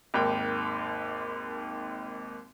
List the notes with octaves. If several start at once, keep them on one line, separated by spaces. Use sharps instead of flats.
G#1 D#2 G5